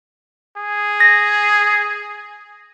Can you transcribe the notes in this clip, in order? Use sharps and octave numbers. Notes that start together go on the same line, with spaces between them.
G#4
A#6